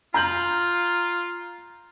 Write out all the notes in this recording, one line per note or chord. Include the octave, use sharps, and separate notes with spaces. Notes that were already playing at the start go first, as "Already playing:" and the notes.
F4 A#5 G6 F#7